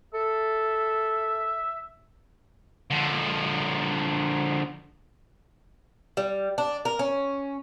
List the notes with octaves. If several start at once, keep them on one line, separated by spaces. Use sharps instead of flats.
A4 E5
D3 F3
G3
D4
A#4
C#4